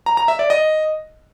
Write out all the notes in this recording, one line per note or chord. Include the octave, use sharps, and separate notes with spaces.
A#5
A#5
E5
D5
D#5